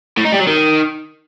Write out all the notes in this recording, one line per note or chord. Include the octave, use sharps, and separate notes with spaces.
A2
D#4
G3
F#3
D#3